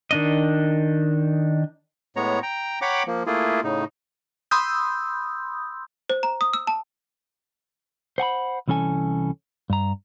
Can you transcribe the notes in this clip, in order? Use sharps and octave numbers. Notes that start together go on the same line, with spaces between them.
D#3 D4 D#5
A2 G#3 B3 C#5 A#5
G5 A#5
C#5 F#5 G5 A#5 B5 D6
F3 A#3
A3 A#3 E4 F4 G#4
A2 C#3 D#4
B5 C6 D#6 E6 G6
C5
A#5
D#6
E6
A5
C5 F#5 G#5 B5
C2 E3 C#4 A4 G#5
G2 A#5